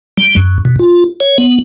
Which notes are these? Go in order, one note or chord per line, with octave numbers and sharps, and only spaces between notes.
G3
F#2
B2
F4
C#5
B3